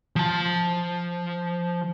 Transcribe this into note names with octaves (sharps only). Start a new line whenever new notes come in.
F3 A5